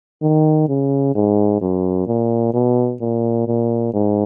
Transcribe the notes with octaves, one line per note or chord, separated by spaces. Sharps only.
D#3
C#3
G#2
F#2
A#2
B2
A#2
A#2
G#2